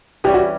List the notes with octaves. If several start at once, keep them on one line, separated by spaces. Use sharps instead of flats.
E3 G3 C#4 G4
F#4